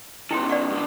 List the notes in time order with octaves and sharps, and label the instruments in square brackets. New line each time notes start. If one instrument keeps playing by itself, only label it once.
[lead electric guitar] B2 D#3 [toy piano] E4 G5 C6
[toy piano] D5 F#5 C#6
[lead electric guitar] G2 D3